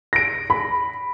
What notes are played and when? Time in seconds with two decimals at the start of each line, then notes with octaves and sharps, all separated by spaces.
0.13 A#6 D7
0.50 B5